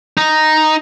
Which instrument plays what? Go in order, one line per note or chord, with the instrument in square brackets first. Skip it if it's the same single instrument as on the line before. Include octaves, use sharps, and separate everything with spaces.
[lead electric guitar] D#4